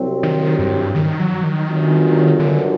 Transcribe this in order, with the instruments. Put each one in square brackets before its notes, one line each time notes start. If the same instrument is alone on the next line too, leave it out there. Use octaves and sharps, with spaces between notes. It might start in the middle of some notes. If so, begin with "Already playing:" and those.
Already playing: [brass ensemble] C2 C3 F#3 C4
[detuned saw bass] D#3
G2
D#3
F#3
D#3
[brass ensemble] G1 F#2 F#3
[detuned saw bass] D3